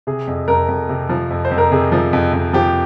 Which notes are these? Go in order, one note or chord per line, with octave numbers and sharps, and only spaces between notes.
C3 G#4
F2
F2 A#4
F2
C3
F3
F2
C5
F2
A#4
C3 G#4
F3
F2
F2
F3 G4